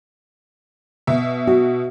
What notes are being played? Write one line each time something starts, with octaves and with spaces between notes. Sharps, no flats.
B2 E5
F#4